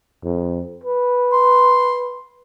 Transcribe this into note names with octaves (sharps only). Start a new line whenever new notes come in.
F2
B4
C6